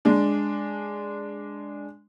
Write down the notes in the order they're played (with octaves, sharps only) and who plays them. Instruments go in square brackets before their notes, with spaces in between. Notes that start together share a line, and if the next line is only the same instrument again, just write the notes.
[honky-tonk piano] G#3 D4